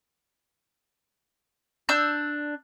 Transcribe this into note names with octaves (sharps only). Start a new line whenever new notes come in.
D4 E6 G6